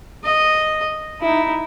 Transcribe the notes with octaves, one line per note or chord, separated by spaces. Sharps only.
D#5
D#4 E4